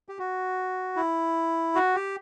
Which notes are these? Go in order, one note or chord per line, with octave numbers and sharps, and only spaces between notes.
G4
F#4
E4
F#4
G4